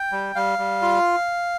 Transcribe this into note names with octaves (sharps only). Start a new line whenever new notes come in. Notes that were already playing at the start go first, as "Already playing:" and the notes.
Already playing: G5
G3
G3 F5
G3
F4